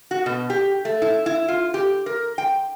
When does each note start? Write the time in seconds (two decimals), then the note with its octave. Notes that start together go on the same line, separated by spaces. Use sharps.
0.11 F#4
0.26 B2
0.50 G4
0.85 A3
1.02 E4
1.26 E4
1.48 F4
1.74 G4
2.06 A#4
2.38 G5